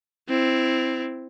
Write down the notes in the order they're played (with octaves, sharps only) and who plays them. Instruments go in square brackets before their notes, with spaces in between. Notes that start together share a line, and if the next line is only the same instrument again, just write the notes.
[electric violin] C4 E4